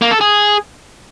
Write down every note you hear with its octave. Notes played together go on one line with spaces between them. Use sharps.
A#3
A4
G#4